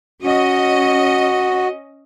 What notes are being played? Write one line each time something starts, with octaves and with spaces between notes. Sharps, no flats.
C#4 F#4 D#5